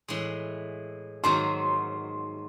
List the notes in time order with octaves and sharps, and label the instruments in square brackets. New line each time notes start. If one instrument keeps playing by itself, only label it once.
[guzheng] A2 E3 G#3
[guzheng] G#2 D#3 F#3 [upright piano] C6